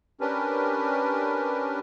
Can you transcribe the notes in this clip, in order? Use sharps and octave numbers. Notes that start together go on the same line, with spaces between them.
C#4 D4 G4 A#4 B4